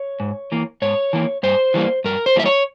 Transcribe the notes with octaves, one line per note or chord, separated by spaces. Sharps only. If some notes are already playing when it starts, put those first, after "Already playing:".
Already playing: C#5
G#2
E3 A#3
G#2 C#5
E3 A#3
G2 C5
E3 G3 A#3
G2 A#4
C5
E3 G3 A#3 E5
C#5